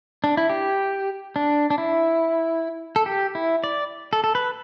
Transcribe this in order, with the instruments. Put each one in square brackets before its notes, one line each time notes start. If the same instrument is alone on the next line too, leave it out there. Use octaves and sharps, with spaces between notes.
[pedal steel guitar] D4
E4
G4
D4
D4
E4
A4
G4
E4
D5
A4
A4
B4